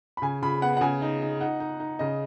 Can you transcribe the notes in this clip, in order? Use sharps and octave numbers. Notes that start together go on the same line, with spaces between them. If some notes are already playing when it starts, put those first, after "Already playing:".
B5
C#3 G#5
C#3 B5
B3 F#5
F#5
C#3 G#5
D#4
D#4
D#4 F#5
D#4
D#4
C#3 D#5